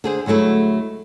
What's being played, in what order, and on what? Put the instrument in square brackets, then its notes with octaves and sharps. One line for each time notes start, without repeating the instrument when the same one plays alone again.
[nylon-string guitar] D3 G#4 C5
D2 F#3 G#3 A3 E4